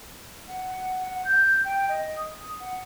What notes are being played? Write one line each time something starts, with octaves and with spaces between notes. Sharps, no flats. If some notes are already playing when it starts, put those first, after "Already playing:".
F#5
F#5
G6
G5
D#5
D#6
F#5